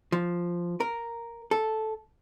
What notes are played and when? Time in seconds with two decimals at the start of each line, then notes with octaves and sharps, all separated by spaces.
0.12 F3
0.80 A#4
1.51 A4